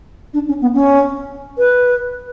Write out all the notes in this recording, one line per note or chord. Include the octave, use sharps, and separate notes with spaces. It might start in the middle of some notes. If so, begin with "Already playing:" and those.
D4
C#4
B3
C#4
B4